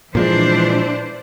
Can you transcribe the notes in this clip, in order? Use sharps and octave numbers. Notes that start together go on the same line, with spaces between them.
A#2 E3 F3 G#3 D4 C5